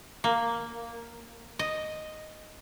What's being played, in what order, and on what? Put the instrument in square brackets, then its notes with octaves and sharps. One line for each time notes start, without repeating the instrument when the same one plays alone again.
[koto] A#3
D#5